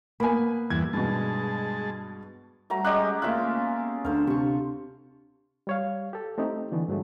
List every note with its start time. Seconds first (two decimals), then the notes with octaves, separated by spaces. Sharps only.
0.20 A#3 B3 G#5 B5
0.70 E2 G2 E3 G#6
0.93 G2 B2 G#3 A5
2.70 F#3 G3 A3 A#5
2.85 G#3 C#4 G4 D#5 F#6
3.22 A3 A#3 C#4 F4 E5 F#6
3.54 B3
4.05 D2 D4 A4 C5 F5
4.27 C3 D4 C6 C#6
5.67 G3 C#5 F5
6.13 G4 A4
6.38 A3 C4 D#4 G4
6.72 D3 E3 A3 B3
6.88 G2 F#3 G#3 A3